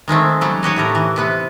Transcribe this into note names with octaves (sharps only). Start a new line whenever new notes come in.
D#3 G#3 A3 C4
C#3 F#3 G3
D#4 F#4 G4 C#5
A2 A4 A#4
E3
C3 B3 B4